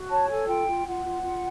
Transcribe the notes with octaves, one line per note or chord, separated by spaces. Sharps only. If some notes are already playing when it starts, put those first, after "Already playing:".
Already playing: F#4
C#5 A5
A4 G#5
F4 G5
F4
F4 F#5
F4
F4